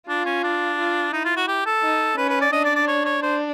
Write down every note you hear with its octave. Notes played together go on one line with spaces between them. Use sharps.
D4 F4
C#4
D4
F4
D#4 E4
F4
F#4
G4
A4
D#4
C#4 B4
B4
D5
D4 D#5
D5
D5
C#5
C#5
D4 C5